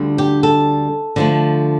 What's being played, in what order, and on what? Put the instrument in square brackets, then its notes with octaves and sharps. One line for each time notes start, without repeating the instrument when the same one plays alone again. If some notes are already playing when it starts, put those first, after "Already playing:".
Already playing: [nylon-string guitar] D2 D3 G3 D4 F4
G4
A4
D3 F3 A3